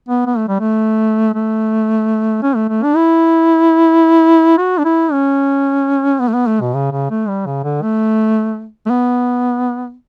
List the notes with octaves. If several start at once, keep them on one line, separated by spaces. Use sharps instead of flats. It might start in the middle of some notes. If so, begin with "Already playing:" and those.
B3
B3
A3
G3
A3
A3
C#4
A3
A3
D4
E4
F#4
D4
E4
C#4
B3
A3
B3
A3
B2
C#3
C#3
A3
G3
C#3
D3
A3
A3
B3